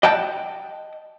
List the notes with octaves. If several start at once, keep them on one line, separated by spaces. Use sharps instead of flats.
D#5 F#5 G5 A5